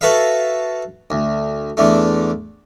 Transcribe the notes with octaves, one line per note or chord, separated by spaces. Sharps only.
F#4 A4 B4 E5 F5
D2
E2 D3 A3